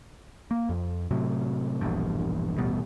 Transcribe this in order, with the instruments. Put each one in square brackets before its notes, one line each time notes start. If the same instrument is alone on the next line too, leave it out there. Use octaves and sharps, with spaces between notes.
[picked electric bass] A#3
F2
A2 C3 F#3
E1 A#1 E2 G2
D#1 A1 B2 G3